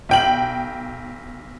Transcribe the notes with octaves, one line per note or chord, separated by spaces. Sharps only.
B1 G5 F#7